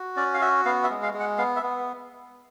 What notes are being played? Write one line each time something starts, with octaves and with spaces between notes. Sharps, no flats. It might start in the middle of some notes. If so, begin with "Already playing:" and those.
Already playing: F#4
C#4 D5
F5
F#4 E5
B3 F5
E5
G#3
F5
G#3
F#5
B3 F5
E5
B3